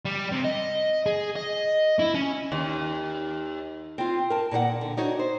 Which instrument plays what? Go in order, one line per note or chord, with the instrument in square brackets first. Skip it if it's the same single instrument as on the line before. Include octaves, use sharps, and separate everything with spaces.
[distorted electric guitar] G3
C3
D#5
G#4
D#5
E4
C#4
[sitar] D#2
[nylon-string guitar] C4 F4
A#4 A5
A#2 D#3 C5 F#5
D3
D4 D#4 F#4 C#5
C5